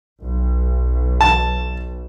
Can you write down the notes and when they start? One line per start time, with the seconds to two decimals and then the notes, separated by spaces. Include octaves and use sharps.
0.21 B1
1.21 A5